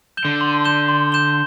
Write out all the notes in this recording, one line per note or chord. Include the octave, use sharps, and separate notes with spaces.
G6 E7 G7
D3
C6
G6 E7 G7
C6
G6 E7 G7